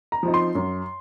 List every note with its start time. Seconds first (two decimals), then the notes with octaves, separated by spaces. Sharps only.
0.12 A#5
0.23 F3 C4 D#4
0.34 C6
0.55 F#2